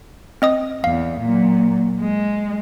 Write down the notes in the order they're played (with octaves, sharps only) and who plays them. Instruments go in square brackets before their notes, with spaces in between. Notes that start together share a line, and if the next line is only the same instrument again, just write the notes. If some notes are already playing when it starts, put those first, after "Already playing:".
[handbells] C4 D#5 D#6
[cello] E2 [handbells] F5
[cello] A#2 F#3
G#3